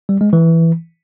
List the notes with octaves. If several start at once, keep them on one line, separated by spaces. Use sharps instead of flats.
G3
G#3
E3